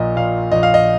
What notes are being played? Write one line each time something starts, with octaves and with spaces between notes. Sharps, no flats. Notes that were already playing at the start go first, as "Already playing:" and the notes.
Already playing: A#1 A#2 D#5
A#2 F5
A#1 D#5
F5
D#5